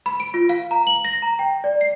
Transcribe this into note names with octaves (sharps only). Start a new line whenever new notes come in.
B5
D7
F4
F5
A#5
F#7
A#6
A#5
G5
D5
C7